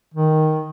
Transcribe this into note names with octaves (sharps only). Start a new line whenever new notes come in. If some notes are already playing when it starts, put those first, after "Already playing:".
D#3